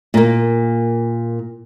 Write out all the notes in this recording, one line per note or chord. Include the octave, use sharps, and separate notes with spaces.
A#2 A#3